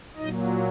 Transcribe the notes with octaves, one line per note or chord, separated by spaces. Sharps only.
A#2 F#3 D#4 D#5